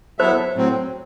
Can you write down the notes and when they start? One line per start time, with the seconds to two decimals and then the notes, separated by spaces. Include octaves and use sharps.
0.19 F#3 B3 E4 A4 C5 E5
0.56 A2 F#3 C4